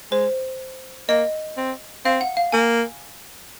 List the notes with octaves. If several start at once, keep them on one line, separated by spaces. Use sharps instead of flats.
G#3 C5
A#3 D#5
C4
C4 F5
F#5
F5
A#3 G#5